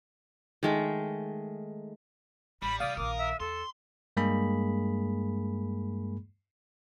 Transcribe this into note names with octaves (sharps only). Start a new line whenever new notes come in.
D#3 G#3 A3
A1 G3 B5
C3 E3 D5 F5 D#6
A#1 D#3 A#4 D6
E5
E2 A4 C6
G2 G#3 A#3 G#4 B5